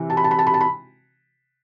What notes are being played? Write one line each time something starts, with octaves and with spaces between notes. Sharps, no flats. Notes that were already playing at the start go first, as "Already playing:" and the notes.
Already playing: C3 E3
A5
B5
A5
B5
A5
B5
A5
B5